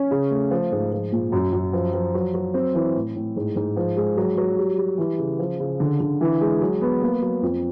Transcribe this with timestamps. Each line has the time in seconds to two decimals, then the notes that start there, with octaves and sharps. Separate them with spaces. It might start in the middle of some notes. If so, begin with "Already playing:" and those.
Already playing: C#4
0.11 C#3
0.31 A3
0.51 F3
0.72 G#2
0.92 F3
1.12 A#2
1.32 F#2
1.53 F#2
1.73 F3
1.93 F3
2.14 F#3
2.34 F#3
2.54 C4
2.74 E3
2.95 A2
3.16 A2
3.36 G#2
3.56 G#2
3.76 F3
3.97 G#3
4.17 F#3
4.37 F#3
4.58 G3
4.78 G3
4.98 E3
5.18 C#3
5.39 F3
5.59 C#3
5.80 D3
6.00 D3
6.21 E3
6.41 G#3
6.61 F#3
6.81 B3
7.02 A#3
7.22 F#3
7.42 F2